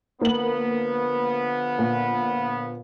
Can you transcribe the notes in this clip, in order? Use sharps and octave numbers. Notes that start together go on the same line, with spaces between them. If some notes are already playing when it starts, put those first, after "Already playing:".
D3 F3 A#3 B3 F#7
A#2